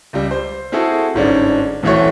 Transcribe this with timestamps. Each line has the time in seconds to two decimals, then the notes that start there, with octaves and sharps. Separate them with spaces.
0.13 C#2 G3
0.31 C5
0.72 C4 E4 F#4 G#4 A4
1.14 G1 G#2 C#4 D4
1.83 D1 A1 E3 A3 F#4 C#5